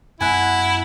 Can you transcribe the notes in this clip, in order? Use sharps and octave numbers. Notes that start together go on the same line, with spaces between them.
F#2 B3 E4 F#5 G#5